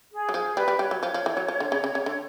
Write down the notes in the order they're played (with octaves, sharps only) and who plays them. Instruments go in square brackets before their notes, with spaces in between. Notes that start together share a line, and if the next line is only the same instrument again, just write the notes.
[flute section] G#4
[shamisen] F#3
[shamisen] F3 [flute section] G#4
[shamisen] G3 [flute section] B4
[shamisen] G3
[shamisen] G3 [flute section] C#5
[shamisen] F#3
F3
F3
E3
F#3
F3
D3
C#3
C#3
C#3
D3